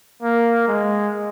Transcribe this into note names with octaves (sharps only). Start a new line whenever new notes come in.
A#3
G#3